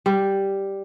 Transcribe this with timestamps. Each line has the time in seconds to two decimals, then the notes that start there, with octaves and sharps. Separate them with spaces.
0.06 G3